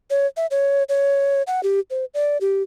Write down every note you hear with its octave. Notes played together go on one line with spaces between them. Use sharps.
C#5
E5
C#5
C#5
F#5
G4
C5
D5
G4